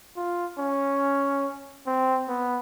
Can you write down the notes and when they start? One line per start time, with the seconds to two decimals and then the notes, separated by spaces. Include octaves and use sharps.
0.16 F4
0.58 C#4
1.87 C4
2.28 B3